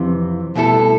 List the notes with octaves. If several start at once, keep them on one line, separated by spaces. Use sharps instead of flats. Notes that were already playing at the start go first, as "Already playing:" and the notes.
Already playing: F2 C3 E3
C2 B2 A3 E4 A4